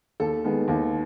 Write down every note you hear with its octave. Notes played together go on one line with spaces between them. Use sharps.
D#2 A4
D#3 G#3 B3
D#2